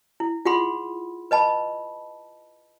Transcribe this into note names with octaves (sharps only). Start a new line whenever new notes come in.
E4
F4 G#4 F#5 B5 C6
B4 D#5 A5 B5